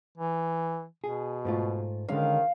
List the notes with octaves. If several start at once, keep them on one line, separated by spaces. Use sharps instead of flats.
E3
B2 G#4
G#2 A3 F4
D3 D#3 G#3 C#4 F5